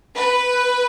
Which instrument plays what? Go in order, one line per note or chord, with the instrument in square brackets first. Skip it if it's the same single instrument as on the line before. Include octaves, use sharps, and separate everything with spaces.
[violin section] B4